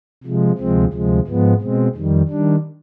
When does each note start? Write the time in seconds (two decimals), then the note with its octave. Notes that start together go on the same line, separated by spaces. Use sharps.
0.24 C3 F3 G#3
0.58 D2 C3 F3 G#3 C4
0.93 D2 C3 F3 G#3
1.27 G#2 F3 G#3 B3
1.60 B2 G#3 C4
1.95 F2 D#3 G3
2.29 D#3 G3 D4